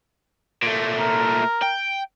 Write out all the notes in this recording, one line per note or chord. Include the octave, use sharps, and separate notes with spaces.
A#2 A3
A#4
G5